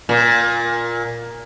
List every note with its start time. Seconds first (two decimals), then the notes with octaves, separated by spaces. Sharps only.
0.09 A#2